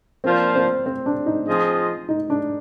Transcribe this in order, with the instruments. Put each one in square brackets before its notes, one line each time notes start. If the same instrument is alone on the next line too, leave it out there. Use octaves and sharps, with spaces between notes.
[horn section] F3 A#3 D4 F4 C5 [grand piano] C4
[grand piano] C4
C4
D4
D#4
[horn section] F3 C4 F4 G#4 D#5
[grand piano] D#4
D4